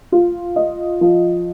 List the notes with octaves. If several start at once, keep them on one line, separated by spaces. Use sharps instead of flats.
F4
D#5
F3